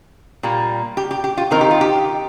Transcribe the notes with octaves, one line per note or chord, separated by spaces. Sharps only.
A#2 G3 A#3
G4
G4
G4
F4
D#3 C4 D#4 A#4
G4
F4
G4